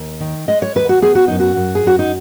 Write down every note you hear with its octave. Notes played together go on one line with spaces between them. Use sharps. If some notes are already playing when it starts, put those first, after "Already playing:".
Already playing: D#2
D#3
G#3 D#5
C#5
D#2 B4
F#4
B3 G#4
F#4
F#2 D#4
F#4
F#2
G#4
F#2 F#4
D#4